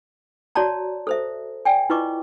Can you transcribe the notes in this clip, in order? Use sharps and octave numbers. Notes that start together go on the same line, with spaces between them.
F#4 C#5 D5 A5 A#5
A4 C5 E5
D5 G5 G#5
E4 F4 B4 D#5 C#6 D6